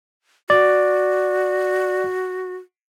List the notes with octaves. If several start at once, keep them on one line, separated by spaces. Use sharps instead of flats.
F#4 D5